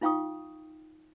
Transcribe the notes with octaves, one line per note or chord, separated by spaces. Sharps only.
D#4 F4 F5 G5 C#6 D#6